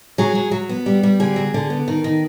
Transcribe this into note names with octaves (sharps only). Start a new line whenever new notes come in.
F#3 G#4
F#3
F#3
B3
G3
G3
D3 G#4
F#3
D3
B3
D#3
D#3